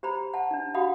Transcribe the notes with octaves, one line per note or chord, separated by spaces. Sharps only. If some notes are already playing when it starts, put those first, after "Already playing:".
G4 C5 A#5 B5
F#5 A5
D4 D#4
F#4 G4 F5 F#5 B5 D#6